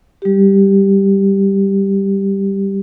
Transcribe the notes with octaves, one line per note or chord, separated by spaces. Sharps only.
G3 G4